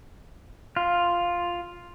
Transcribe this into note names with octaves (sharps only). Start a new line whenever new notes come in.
F4